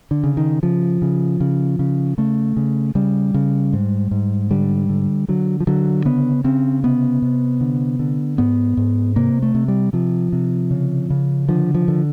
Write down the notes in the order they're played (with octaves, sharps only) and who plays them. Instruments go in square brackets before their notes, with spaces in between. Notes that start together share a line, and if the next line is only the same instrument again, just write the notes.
[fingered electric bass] D3
C#3
D#3
C#3 F3
C#3
C#3
C#3
C#3 A3
C#3
C#3 G3
C#3
G#2
G#2
D3 G3
D3
D3 F#3
F3
D3 F#3
C#3 B3
C#3 C4
C3 B3
C3
D3
D3
G#2 B3
G#2
C3 A#3
A3
C3
G3
C3 F3
C3
C#3
C#3
D3 F3
F3
D3